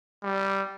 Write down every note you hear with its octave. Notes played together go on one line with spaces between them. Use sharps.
G3